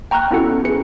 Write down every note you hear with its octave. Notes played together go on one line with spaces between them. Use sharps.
G5 A#5 C#6 F6 F#6
B3 C#4 E4 F#4 A4 C#7
G#4 B4 C#7